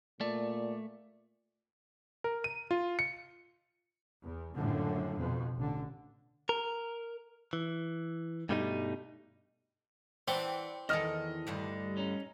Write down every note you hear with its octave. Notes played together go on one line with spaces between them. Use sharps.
A#2 A3 D5
A#4
D#7
F4
C#7
E2
F#1 F#2 A2 D3 F3
F2 B2
A1 D3
A#4
E3
G2 B2 G3 A3 B3 D#4
E3 C4 D4 D5 F#5 G5
E2 D#3 E4 A4 D#5 F6
D2 G2 D3
C#4 D#4